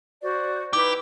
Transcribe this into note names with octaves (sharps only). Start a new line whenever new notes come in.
F#4 C5 D5
D#4 E4 G4 B4 D6